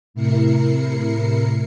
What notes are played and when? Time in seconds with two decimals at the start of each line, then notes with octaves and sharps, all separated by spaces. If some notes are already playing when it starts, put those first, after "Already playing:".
0.14 A2 C3 E4 A#4 C7 C#7